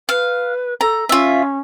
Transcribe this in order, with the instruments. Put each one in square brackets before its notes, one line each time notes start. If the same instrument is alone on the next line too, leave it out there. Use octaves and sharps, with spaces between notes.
[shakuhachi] B4 [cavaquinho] F5
[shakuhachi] A4 [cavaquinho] A#5
[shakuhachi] C#4 [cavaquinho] F4 E5